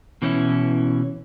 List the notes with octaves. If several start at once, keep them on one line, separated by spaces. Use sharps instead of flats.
B2 E3 A3 C4 C#4 E4